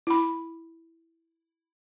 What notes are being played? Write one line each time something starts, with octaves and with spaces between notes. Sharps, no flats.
E4 B5